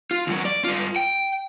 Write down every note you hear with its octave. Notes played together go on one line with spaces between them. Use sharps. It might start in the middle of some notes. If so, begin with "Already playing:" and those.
F4
D#2 F#3
D5
G2 F4
G5